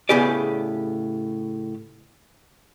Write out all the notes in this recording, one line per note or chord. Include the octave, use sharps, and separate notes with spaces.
A2 C#3 B3 G4 G#4 D5